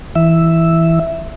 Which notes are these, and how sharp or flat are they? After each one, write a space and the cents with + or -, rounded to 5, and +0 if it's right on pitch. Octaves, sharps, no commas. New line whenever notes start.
E3 +0 E5 +0